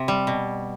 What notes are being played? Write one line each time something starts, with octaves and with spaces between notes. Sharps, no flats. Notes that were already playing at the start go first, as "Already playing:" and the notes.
Already playing: C3
G3
B2